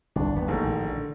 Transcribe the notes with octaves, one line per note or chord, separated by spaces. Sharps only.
G1 C2 D4
G1 D#2 B3
A1 G#2 D#3 F3 A#3
A#1
D3